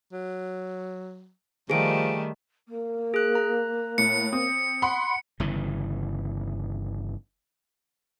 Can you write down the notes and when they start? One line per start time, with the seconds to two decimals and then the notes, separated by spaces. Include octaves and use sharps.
0.12 F#3
1.70 D#3 F3 G3 A3 G#4 D7
2.68 A#3
3.14 G#4 F#6
3.35 A#5 F#6
3.98 A2 C#7
4.33 C4 D#6
4.82 F#5 B5 C6
5.40 G1 C#3 E3